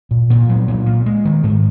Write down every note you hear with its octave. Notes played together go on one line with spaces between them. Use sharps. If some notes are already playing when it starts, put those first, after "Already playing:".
A#2
A#2
F#3
A#2
A#3
G#3
D#3
G#2